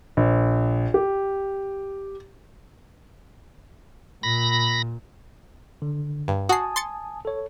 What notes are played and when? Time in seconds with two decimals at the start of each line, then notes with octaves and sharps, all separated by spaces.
0.17 A#1
0.94 G4
4.23 A#2 B5 A#6
5.82 D3
6.28 G2
6.49 F#4 G#5 A5 D#6 C7
6.76 C6 A6 C#7
7.25 A4 C#5